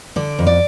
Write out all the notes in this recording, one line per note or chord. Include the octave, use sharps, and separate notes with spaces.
D3 D5
F2
D5